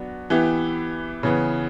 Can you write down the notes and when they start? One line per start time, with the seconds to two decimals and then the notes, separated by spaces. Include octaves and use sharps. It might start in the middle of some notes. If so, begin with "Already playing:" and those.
Already playing: F#3 B3 D4 F#4
0.30 E3 B3 E4 G4
1.23 C#3 E3 B3